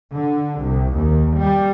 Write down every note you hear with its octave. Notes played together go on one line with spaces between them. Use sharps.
D3
C2
D#2
G3